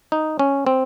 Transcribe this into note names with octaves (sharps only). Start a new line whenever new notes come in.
D#4
C#4
C4